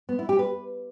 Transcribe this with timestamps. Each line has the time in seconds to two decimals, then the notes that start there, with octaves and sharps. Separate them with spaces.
0.09 B3
0.19 E4
0.29 G4
0.39 B4